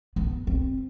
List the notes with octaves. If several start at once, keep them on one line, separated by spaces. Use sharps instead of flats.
B3
C4